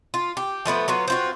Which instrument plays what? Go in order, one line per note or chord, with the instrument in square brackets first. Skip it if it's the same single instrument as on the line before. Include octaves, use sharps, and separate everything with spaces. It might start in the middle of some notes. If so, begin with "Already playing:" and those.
[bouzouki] F4
G4
F3 A3 B3 B4
F#3 B3 F4
C4 F4 F#4